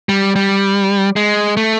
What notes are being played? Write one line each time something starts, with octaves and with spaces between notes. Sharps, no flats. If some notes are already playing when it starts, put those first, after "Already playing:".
G3
G3
G#3
A3